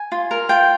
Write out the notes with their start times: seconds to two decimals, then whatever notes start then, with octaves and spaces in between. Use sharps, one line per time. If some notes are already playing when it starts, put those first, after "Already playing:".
Already playing: G#5
0.12 F4
0.31 A#4
0.49 F4 G5